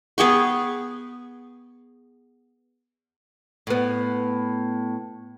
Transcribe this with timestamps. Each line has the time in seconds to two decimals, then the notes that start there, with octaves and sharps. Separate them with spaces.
0.18 B3 G#4 G5 C#6
3.67 A2 B3